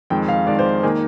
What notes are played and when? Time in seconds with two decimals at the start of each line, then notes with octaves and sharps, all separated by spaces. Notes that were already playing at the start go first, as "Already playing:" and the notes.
0.10 F2 D#3 G#3 G5
0.29 F5
0.47 F2 D#3 G#3 D5
0.59 C5
0.83 D#3 A#3 D#4 G#4